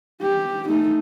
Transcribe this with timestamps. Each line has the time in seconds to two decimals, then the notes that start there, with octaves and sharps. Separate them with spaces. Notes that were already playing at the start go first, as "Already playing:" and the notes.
0.22 G4
0.69 A3 D#4